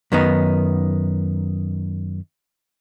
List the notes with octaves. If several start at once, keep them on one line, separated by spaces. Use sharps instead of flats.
F#2 D#3 B3 D#4